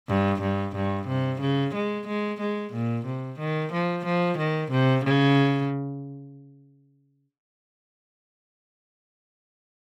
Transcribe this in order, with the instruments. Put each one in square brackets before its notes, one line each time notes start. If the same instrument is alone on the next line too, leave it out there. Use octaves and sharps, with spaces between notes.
[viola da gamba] G2
G2
G2
C3
C#3
G#3
G#3
G#3
A#2
C3
D#3
F3
F3
D#3
C3
C#3